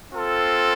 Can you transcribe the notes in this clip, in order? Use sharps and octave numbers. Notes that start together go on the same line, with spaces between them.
C4 F4 A4